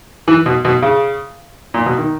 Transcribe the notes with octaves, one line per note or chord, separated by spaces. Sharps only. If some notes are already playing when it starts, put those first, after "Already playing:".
E3
B2
B2
C#3
A#2
B2
D#3